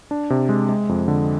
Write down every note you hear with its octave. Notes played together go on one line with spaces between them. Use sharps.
D4
C3
G#3
G#3
F2
D3